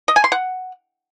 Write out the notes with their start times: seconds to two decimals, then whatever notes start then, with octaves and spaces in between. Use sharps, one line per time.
0.08 D#5
0.16 G#5
0.24 C6
0.32 F#5